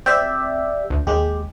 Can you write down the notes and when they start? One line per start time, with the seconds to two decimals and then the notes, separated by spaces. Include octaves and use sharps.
0.06 C4 G4 D5 E5 G6
0.90 D2
1.07 D#2 G#3 G4